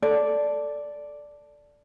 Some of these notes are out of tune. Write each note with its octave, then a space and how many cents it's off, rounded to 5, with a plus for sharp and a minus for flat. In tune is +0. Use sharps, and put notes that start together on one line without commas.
A4 +0 D5 -5